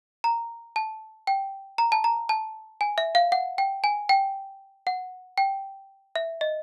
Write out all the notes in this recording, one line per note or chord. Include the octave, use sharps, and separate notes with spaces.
A#5
A5
G5
A#5
A5
A#5
A5
G#5
E5
F5
F#5
G5
G#5
G5
F#5
G5
E5
D#5